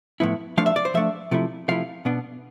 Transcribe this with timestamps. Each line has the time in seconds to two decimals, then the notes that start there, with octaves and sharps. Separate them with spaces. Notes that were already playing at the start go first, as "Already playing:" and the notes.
0.20 A2 F3 B3 E4
0.57 F3 A3 D4 F5
0.66 E5
0.76 D5
0.85 C5
0.94 F3 A3 D4 E5
1.31 C3 F3 A3 E4
1.68 C3 F3 A3 E4 F5
2.05 B2 B3 D4